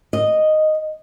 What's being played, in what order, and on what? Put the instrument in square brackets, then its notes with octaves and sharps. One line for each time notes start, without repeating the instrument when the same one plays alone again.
[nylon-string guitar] D#5